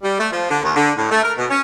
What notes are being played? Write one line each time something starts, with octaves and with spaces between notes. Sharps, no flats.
G3
A3
F3
D3
D#2
D3
A2
A3
A#4
B2
C#4